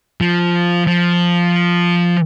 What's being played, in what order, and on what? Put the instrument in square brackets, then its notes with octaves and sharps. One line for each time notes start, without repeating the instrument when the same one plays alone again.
[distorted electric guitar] F3
F3